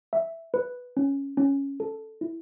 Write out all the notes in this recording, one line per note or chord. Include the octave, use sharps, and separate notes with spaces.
E5
B4
C#4
C#4
A4
E4